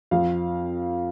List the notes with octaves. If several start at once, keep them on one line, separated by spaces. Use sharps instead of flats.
F2 F3 F5